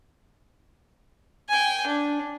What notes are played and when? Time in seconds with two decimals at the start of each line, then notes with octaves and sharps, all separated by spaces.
1.49 G5 G#5
1.87 D4